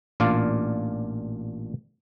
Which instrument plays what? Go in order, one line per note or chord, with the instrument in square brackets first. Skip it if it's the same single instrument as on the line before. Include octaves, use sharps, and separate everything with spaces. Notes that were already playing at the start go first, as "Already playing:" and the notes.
[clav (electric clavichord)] A1 A#2 D4 F4 D5 F5